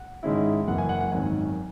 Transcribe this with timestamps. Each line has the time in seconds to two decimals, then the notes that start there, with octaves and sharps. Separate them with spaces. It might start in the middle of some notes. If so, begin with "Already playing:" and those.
Already playing: F#5
0.23 G#2 D#3 G#3 C#4 E4
0.68 F#1 F#2 E3 F#5
0.78 G#5
0.89 F#5
1.00 F#5
1.12 G#1 F#2 D#3 G#5